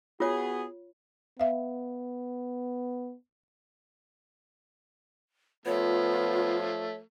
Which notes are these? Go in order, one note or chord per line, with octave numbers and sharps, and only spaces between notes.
B3 F4 F#4 G#4 C#5
B3 E5 F5
F3 A3 B3 F4 C#5